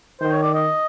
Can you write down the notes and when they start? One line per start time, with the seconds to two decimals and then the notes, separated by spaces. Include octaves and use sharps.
0.21 D#3 C5
0.32 C#5
0.43 D5
0.54 D#5